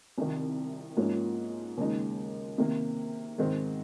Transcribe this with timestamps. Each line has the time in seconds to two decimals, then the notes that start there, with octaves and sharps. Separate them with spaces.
0.18 C2 C3 D#3
0.97 G#2 F3 A#3 C#4
1.77 D#2 C#3 G#3 D#4
2.58 C3 D#3 A#3
3.38 G#2 D#3 G#3 C4